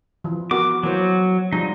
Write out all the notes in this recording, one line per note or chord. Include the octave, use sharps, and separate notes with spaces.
E3 F3
B3 F#4 A#4 D6
E3 F#3 A#3 C5
F3 G3 D#4